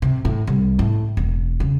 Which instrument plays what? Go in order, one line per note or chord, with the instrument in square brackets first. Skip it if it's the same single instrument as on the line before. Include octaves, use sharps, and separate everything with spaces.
[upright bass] C3
A2
C2
A2
E1
C#3